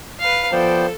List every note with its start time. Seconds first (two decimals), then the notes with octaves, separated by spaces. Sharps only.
0.20 B4 F5
0.52 F3 B3 A4 C5 D5 G5